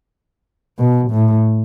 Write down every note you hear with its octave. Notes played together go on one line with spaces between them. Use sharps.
B2
A2